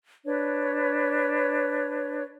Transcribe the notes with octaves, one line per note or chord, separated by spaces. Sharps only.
D4 B4 C#5